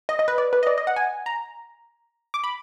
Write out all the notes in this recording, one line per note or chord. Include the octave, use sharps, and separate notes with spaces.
D#5
D#5
B4
D5
B4
D#5
D5
D#5
F#5
G#5
A#5
D6
B5